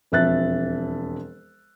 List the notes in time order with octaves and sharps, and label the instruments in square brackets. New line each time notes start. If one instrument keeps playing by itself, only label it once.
[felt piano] E1 F2 E5 F#6 A6